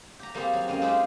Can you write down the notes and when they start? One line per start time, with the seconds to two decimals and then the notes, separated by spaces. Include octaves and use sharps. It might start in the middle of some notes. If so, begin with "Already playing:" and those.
0.19 G4 A#5
0.34 G3 A#3 C4 G4 G#4
0.53 F#3
0.68 F#2 A#3 D#5
0.82 G#3 C4 D#4 F4 G4